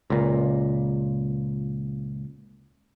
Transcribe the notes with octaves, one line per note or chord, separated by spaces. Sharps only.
C#2 A#2